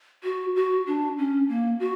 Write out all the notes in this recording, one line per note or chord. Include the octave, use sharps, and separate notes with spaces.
F#4
F#4
D4
C#4
A#3
F#4